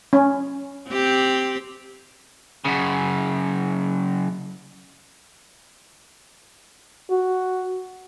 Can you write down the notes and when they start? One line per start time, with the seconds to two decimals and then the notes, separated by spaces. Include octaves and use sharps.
0.13 C#4
0.89 C4 G4
2.65 F#2 C#3
7.10 F#4